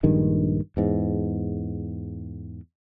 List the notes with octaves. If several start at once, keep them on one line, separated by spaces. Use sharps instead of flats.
A#1 G2 D#3 G#3
E2 G#2